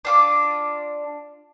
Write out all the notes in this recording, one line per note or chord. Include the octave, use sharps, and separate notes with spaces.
D4 F4 D6